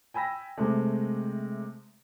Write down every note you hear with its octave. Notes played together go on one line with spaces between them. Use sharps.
G5 G#5 B5 E6 A#6
C3 G#3 A3